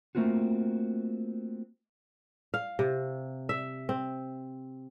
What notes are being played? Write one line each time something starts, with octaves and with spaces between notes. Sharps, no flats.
A3 A#3 C4 F4 F#4
F5
C3
E5
C4